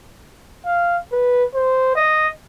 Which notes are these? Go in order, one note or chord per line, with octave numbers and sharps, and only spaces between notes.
F5
B4
C5
D#5